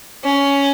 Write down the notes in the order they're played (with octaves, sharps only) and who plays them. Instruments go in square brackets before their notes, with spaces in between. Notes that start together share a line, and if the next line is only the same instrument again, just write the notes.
[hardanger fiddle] C#4